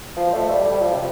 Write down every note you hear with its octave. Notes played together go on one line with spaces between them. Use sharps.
F3
A3
G3
G3
G3
F3
C3